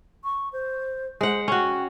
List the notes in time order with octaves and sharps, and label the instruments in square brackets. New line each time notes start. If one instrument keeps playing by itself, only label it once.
[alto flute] C#6
C5
[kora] G#3 F#5 [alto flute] C5
[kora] C#4 F#4 [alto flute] G5